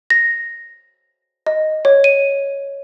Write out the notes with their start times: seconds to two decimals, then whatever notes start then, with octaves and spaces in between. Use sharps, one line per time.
0.10 A#6
1.46 D#5
1.85 C#5
2.04 D#7